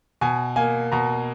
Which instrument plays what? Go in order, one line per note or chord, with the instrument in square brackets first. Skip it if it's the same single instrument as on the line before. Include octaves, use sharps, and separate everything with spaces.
[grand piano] B2 G#5
A#3 G#5
B2 A#5